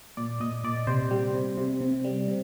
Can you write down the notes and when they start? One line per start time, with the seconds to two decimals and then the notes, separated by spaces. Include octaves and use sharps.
0.17 A#2 D5
0.40 A#2 D#5
0.64 A#2 D5
0.87 C3 C5
1.11 G3
1.34 C3
1.57 C3
1.81 C3
2.04 G3
2.28 C3